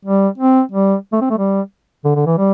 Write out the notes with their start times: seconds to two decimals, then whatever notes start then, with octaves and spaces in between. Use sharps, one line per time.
0.05 G3
0.38 C4
0.72 G3
1.12 A3
1.21 C4
1.30 A3
1.38 G3
2.05 D3
2.16 D3
2.26 E3
2.38 G3